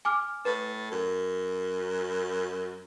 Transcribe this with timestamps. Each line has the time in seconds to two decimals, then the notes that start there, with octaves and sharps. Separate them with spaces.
0.05 G#5 D6 F6
0.45 A2 B4
0.91 F#2